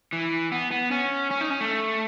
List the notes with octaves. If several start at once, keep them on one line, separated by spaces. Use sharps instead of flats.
E3
B3
B3
C#4
C#4
D#4
C#4
A3